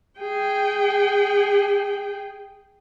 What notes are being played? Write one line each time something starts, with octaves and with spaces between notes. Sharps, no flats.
G#4 G5